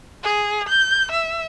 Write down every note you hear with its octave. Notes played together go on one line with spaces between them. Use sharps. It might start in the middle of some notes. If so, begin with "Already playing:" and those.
G#4
G6
E5